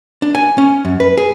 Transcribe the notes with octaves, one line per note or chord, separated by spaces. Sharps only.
D4
G#5
C#4
F#2
B4
G#4